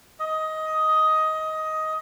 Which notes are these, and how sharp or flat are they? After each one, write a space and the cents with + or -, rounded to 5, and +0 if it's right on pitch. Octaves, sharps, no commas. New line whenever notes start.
D#5 +15